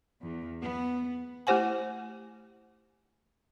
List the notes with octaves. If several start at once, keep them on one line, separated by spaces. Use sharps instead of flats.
E2
B3
A3 E4 G4 C5 F#5 G#5